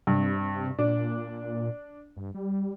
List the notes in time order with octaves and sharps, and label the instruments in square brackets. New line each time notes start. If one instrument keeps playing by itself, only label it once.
[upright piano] G2 [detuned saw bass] C3
[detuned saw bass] A#2 [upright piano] D4
[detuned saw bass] G2
G3